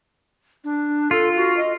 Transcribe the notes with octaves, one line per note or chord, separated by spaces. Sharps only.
D4
F4 A4
F#4
D#5